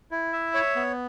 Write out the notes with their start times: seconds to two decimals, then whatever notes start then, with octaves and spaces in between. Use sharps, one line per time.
0.11 E4
0.33 E5
0.54 C#5
0.75 B3